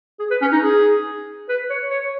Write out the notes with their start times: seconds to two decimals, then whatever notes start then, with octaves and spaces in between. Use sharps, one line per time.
0.20 G#4
0.31 B4
0.42 C#4
0.52 D#4
0.62 G#4
1.49 B4
1.70 C#5
1.91 C#5